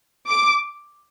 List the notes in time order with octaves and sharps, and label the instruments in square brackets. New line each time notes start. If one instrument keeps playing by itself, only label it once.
[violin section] D6